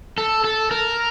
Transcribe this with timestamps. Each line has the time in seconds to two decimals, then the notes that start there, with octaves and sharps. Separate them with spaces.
0.18 A4
0.44 A4
0.71 A#4